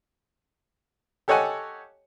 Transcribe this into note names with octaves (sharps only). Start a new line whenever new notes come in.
G4 A4 C#5 D#5 F#5 G#5